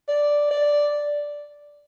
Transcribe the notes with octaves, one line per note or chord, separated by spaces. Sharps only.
D5
D5